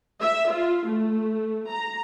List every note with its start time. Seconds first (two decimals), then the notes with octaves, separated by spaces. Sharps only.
0.21 E5
0.50 F4
0.86 A3
1.69 A#5